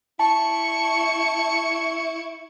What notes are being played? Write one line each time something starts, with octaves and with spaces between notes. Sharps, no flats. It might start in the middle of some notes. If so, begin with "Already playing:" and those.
E4 A5 C#6